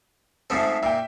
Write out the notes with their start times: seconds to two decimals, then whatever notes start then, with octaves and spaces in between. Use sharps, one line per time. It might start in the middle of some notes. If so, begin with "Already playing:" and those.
0.50 G#2 F3 A3 C4 E5
0.83 A#2 E5 G5